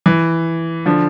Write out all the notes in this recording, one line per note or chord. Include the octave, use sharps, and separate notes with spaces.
E3
D3 F3